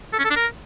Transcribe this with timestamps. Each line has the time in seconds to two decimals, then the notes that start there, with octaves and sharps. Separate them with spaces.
0.13 A4
0.19 C#4
0.24 A4
0.30 D4
0.36 A#4